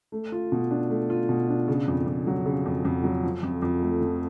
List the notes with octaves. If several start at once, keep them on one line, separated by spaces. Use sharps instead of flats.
A3
F4
B2
D4
A3
F4
B2
D4
C#3
F2
F2
F#3
C#3
F2
F2
F#3
F3
F2
F2
A3
F3